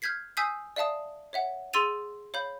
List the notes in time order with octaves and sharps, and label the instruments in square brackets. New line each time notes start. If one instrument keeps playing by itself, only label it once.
[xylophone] F6 G6 G#6 B6 C7
G#5 D#6 E6 G6 B6 C7
D5 E5 F5 A5 D#6
C#5 E5 F#5
G#4 C6 E6 A6 D#7 F7
C#5 F5 B5 G6